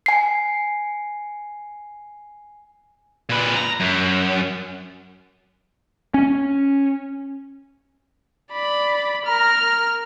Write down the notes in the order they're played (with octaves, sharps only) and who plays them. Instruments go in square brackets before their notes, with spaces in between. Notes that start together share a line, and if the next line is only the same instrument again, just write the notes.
[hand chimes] G#5 C7
[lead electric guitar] A#2 B4
A#5
F#2
[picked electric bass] C#4
[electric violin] D5 B5
[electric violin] A#4 F6 [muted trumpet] A#5